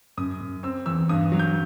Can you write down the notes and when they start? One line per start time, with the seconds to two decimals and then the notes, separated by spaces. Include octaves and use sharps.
0.17 F#2 D#6
0.41 F#2
0.63 C4 E6
0.86 E2 E6
1.09 G2 D#6
1.32 F#3
1.39 G6